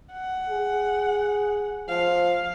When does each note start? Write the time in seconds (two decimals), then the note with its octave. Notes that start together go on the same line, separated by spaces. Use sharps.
0.12 F#5
0.49 G#4
1.89 F3 F5